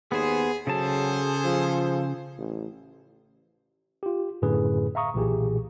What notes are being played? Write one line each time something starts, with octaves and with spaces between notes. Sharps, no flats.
D#2 B3 G#4 C5
C#3 F#3 G#4 A4 C5 A5
F3
A1
F4 G4
F#2 A2 D3 G#4 B4
E5 F5 A#5 C#6 D#6
B1 A#2 E3 G4 G#4